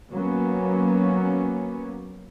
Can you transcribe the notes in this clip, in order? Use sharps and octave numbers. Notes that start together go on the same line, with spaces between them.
F#3 A#3 B3 C#4